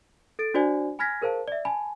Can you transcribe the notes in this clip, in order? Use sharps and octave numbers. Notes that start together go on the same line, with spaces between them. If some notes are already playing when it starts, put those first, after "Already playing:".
A4 A6 D7
D4 F#4 C5 D5 G#5
G#5 B5 F6 G#6 A#6 B6
G#4 A#4 C5 F5 A5
D5 E5
G#5 A5 B5